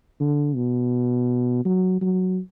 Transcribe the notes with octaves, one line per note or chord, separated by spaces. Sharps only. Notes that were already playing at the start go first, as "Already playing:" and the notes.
D3
B2
F#3
F#3